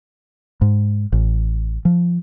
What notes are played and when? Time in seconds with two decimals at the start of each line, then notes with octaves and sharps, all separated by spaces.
0.61 G#2
1.12 A1
1.85 F3